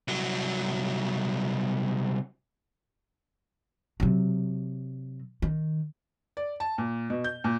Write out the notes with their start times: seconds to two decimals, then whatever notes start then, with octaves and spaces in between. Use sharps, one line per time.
0.08 C2 F#3
4.00 C3 F#3
5.42 D#3
6.37 D5
6.60 A5
6.78 A#2
7.10 B2
7.24 G6
7.44 A#2